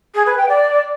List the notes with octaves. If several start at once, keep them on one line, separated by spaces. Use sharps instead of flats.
G#4
B4
G5
D5